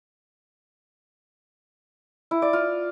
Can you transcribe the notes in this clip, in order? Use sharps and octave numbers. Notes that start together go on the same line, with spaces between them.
E4
D5
F4